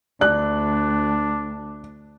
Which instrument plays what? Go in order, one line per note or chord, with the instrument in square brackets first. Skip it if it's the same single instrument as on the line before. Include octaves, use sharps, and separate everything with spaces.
[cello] D2 [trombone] D4 [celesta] D5 [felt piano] F#6